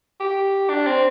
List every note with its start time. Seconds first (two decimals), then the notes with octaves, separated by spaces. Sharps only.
0.20 G4
0.70 D4
0.87 C4